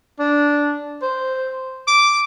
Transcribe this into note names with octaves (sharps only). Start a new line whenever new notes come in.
D4
C5
D6